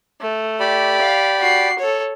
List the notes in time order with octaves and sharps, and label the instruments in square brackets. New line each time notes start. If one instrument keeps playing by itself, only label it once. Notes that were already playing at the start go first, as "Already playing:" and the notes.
[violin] A3
[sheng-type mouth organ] G4 D5 B5
[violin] F5
F#4 C7
A4 C#5